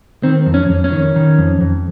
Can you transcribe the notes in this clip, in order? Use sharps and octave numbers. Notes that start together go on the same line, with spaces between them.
D#3 C4
F2
C#4
F2
C#4
D#3
D#3
F2
F2